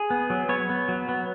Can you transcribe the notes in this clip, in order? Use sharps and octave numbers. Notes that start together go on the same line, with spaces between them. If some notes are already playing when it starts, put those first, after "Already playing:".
Already playing: G#4
B3
F#3
B3 C#5
B3
F#3
B3